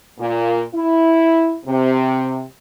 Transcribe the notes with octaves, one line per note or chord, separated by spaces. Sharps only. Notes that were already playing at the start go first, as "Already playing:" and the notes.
A#2
E4
C3